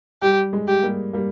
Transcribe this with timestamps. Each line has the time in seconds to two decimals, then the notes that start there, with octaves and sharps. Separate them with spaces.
0.22 G3 G4
0.53 G#3
0.68 G4
0.83 G3 A#3
1.13 G3 A#3